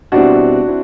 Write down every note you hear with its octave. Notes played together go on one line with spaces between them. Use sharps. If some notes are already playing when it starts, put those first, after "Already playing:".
B2 G3 C4 D4 E4 F#4
C4 E4